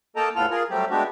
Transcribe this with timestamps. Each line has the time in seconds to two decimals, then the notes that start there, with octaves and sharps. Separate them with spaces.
0.16 A#3 A4 D#5 G5 A5 A#5
0.36 E2 A2 B3 F4 A4 F6
0.50 F4 G#4 A#4
0.70 F#3 G3 A3 C4 G4
0.90 G#3 A3 B3 D4 F#4 G4